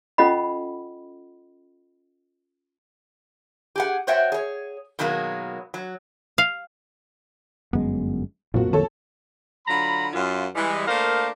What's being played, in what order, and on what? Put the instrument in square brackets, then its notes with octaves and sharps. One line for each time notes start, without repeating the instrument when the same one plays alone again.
[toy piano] C#4 F4 A4 D#5 F#5 B5
[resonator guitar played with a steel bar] G4 G#4 F#5
F#4 C5 C#5 E5 F#5 G5
G#4 C#5
B2 D#3 F#3 G#3 A#3
F#3
[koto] F5
[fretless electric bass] G1 F#2 G#3 [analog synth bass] B3
[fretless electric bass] B1 F2 A#3 [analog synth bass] A#2 [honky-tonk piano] F3 F#4
[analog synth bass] D#3 [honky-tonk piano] A4 C#5 A5
[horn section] D3 F#3 F4 A#5 B5
F#2 F4
E3 G3 G#3
A3 A#3 D4 A#4 C5 F5